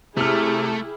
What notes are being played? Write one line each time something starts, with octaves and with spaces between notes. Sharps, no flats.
C3 A3 E4 G4 G#4 F6